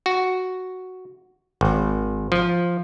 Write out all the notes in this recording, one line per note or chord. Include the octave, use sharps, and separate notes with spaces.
F#4
G#1
F3